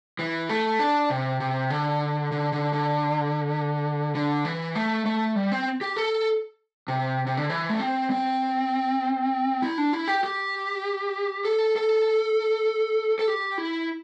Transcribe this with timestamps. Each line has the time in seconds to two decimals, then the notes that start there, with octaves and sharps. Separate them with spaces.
0.19 E3
0.49 A3
0.79 D4
1.10 C3
1.40 C3
1.70 D3
2.32 D3
2.52 D3
2.73 D3
4.15 D3
4.45 E3
4.75 A3
5.06 A3
5.36 G3
5.52 C4
5.81 G4
5.96 A4
6.88 C3
7.27 C3
7.37 D3
7.50 E3
7.69 A3
7.79 C4
8.10 C4
9.62 E4
9.78 D4
9.93 E4
10.08 G4
10.24 G4
11.45 A4
11.76 A4
13.19 A4
13.28 G4
13.58 E4